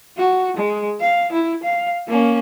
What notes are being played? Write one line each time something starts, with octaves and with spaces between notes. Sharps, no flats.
F#4
G#3
F5
E4
F5
A#3 C#4